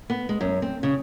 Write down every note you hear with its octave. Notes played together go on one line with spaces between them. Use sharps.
B3
G#3
F#2
C4
C#3